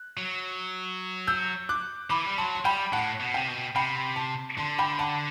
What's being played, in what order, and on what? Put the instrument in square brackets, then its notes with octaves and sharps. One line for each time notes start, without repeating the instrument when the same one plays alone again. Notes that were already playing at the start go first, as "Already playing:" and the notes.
Already playing: [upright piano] F#6
[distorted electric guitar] F#3
[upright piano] E6 G6
D6 F#6
[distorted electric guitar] E3 [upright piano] B5 D6
[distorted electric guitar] G3
[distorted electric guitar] F#3 [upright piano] A5 C6
[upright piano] C6
[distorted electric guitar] G3 [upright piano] G5 B5
[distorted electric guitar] A2 [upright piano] F#5 A5
[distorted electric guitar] B2
[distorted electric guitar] C3 [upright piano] G5
[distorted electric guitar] B2
[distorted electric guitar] C3 [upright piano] G5 B5
[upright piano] A5 C6
[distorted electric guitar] D3 [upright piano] A5 C6
[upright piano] G5 B5
F#5 A5